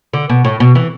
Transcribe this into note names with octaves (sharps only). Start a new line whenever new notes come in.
D3
B2
A2
B2
E3